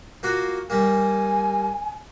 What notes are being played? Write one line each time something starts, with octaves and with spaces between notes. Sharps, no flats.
A#3 F4 F#4
G3 A#3 G#5